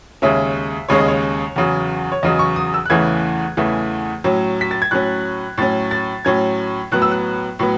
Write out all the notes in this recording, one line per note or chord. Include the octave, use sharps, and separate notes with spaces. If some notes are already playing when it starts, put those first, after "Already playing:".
D#2 C#3 G#3 C#4 E5
D#2 C#3 G#3 C#4 C#5
D#5
C#5
E2 C#3 F#3
C#5
E2 C#3 F#3 D#5
C#6
D#6
E6
F#6
E2 C#3 E3 A3 G#6
E2 C#3 E3 A3
A2 F#3 C#4
B6
A6
G#6
A2 F#3 C#4 F#6
A2 F#3 C#4 A6
A6
A2 F#3 C#4 G#6
A2 F#3 B3 F#6
E6
F#6
A2 F#3 B3